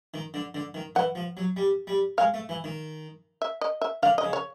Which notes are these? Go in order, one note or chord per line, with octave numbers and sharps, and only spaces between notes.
D#3
D3
D3
D#3
E3 F#5
F3
F#3
G3
G3
G#3 F5
A3
E3
D#3
E5
D#5
E5
D3 F5
C#3 D#5
C#5